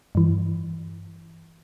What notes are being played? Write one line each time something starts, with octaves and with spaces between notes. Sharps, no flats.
G2 E3